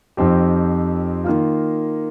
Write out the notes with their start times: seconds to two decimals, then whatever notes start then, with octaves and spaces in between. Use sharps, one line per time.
0.17 F2 F3 C4 D#4 G4
1.24 D#3 A#3 F4